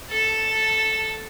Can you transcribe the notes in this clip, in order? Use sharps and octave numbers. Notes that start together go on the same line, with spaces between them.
A4 A5